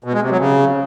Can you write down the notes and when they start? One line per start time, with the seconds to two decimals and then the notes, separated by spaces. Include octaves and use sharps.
0.04 B2
0.13 G#3
0.22 C3
0.30 F#3
0.39 C#3